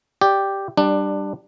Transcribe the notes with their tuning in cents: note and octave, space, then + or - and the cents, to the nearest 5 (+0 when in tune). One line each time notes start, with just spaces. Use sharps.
G4 +0 D5 +0
G3 +0 D4 +15